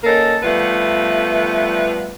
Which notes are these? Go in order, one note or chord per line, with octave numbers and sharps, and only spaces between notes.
A#3 C#4 D#4 A4 A#4
F3 G3 A3 B3 B4